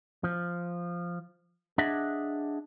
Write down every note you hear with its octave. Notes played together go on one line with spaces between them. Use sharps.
F3
D4 G#4 D#5 E5 F#5